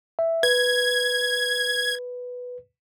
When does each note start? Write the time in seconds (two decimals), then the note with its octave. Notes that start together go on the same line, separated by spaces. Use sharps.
0.19 E5
0.43 B4 G#6